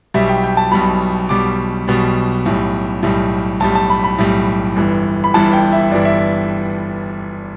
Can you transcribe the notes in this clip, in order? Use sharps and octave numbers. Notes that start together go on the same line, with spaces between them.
B1 B2 G3 E5
G5
G5
A5
B1 B2 G3 B5
B1 B2 G3 D6
B1 B2 G3
B1 A2 G3
B1 A2 G3
B1 A2 G3 A5
A5
B5
B5
B1 A2 G3
G1 G2 E3
B5
G1 G2 E3 A5
G5
E5
G1 G2 E3 D5
E5